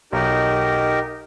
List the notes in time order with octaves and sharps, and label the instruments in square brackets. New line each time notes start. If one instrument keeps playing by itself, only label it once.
[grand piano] B1 [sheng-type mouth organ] D#4 G4 A#4